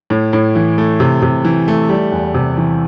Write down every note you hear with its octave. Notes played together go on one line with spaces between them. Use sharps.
A2
A2
E3
A3
C3
C3
E3
A3
G3
E2
C3
E3